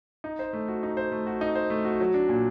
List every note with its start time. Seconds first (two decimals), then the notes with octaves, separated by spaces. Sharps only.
0.24 D#4
0.39 C5
0.53 A3
0.68 F#4
0.83 D#4
0.97 C5
1.12 A3
1.27 F#4
1.41 D#4
1.55 C5
1.70 A3
1.85 F#4
2.00 F#3
2.14 D4
2.29 A#2